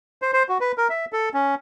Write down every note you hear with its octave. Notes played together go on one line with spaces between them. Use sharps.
C5
C5
F#4
B4
A#4
E5
A4
C#4